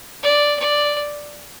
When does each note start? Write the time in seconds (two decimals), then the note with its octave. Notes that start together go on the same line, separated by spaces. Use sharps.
0.23 D5
0.60 D5